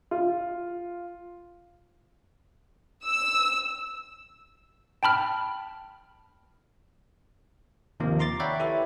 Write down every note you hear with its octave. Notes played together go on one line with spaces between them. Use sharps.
F4
E6
G5 A5 B5 F6
D#2 C3 D#3 F3 A#3
A#5 C6 D6 A6
C#5 D5 E5 F#5 G5 B5
E4 G4 A4 B4 C#5 E5